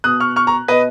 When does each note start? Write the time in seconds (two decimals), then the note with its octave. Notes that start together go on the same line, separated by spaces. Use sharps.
0.04 B2 D#6 F#6
0.20 C#6 F6
0.36 C#6 F6
0.47 A#5 C#6
0.68 B2 B4 D#5